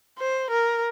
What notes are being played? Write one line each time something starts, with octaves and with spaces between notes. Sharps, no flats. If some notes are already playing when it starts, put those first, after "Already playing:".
C5
A#4